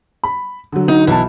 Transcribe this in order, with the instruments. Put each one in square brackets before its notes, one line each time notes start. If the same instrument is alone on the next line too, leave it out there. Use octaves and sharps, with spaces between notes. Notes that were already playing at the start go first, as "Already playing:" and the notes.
[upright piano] B5
D3 F#3
[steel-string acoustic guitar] D#4
[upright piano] B1 A5 [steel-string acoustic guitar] E3